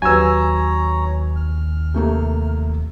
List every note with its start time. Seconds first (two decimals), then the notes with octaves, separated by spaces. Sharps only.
0.02 D#2 F#3 G4 B4 C#5 G#5 A#5 E6
1.36 F6
1.94 C3 A3 A#3